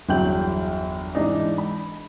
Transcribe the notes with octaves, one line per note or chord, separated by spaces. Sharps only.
G1 E2 F#3 G5 G6 F#7
G#2 E3 D4 D#4
B5